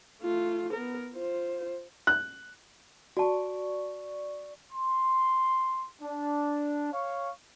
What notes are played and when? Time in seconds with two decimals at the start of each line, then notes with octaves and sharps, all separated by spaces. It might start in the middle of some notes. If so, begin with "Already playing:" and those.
0.22 A3 F4
0.73 B3 A#4
1.15 F4 C5
2.07 F#6
3.17 F#4 D5 A5 C#6
4.72 C6
6.02 D4
6.92 C#5 F5 C#6